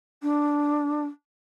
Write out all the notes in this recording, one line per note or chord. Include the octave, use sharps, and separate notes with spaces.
D4